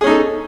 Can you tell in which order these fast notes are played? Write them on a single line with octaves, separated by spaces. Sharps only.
G#4 C#4 D#4 A4